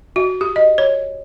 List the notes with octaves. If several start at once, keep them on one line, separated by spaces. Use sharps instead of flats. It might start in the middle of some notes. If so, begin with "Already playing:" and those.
F#4
G4
D#5
C#5